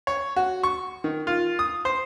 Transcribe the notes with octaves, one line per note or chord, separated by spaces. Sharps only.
C#5
F#4
C#6
D#3
F4
D#6
C5